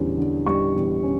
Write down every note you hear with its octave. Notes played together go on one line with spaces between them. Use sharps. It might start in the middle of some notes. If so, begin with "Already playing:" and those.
Already playing: E2 D3 G3 C#4
D3
G3 C#6
E2
C#4